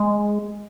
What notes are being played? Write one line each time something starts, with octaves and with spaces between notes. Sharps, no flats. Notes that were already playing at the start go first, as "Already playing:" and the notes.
Already playing: G#3